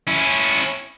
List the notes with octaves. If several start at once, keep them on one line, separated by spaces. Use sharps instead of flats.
C#4 E4